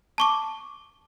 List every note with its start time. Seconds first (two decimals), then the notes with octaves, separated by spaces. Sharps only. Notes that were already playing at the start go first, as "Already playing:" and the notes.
0.18 A5 C#6 D6